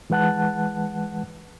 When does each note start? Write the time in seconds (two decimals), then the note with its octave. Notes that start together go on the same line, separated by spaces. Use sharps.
0.10 E3 G#3 B4 F#5 A5 F#6